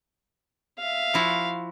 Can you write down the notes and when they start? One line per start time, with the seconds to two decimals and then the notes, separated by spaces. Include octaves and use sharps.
0.78 E5 F5
1.14 F3 E4 F#4